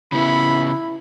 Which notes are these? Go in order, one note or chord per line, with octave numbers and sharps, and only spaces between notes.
C#3 B3 E4 B5